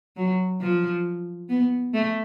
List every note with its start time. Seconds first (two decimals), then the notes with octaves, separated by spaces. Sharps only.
0.17 F#3
0.61 F3
1.50 B3
1.94 A3